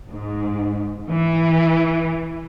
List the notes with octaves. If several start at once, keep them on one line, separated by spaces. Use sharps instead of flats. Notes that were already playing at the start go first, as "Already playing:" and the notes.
G#2
E3